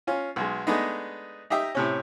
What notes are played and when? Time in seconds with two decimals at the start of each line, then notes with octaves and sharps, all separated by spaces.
0.07 C#4 F4
0.36 B1 G#3
0.67 G#3 A3 B3 D4 D#4
1.50 D#4 G4 D#5 E5
1.75 A2 C3 C#4